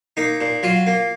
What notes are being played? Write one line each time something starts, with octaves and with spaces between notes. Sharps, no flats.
A#3 D#4
A#2
F#3 F4
A#3